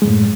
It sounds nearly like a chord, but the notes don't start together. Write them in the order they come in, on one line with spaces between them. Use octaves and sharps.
G#3 F#2 A2